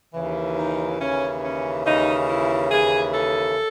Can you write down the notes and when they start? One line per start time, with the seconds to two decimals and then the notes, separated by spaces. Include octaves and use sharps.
0.14 D#2 C#3 E3
0.57 D#4
1.00 D#2 C#3 E3 C#4
1.43 C#4
1.85 D#2 C#3 E3 D#4
2.29 E4
2.71 D#2 C#3 E3 G#4
3.14 A4